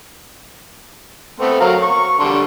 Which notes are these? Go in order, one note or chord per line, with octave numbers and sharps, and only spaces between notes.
A3 B3 C4
F#3 A#4 F5
C#6
D3 G3 C6